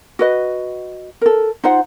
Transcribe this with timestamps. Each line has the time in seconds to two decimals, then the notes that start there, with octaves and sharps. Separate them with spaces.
0.19 F#4 B4 D#5
1.21 A4 A#4
1.64 D#4 F4 C5 F#5